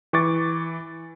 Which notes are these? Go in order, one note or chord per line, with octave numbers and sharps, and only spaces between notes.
E3 C#6 D6 A6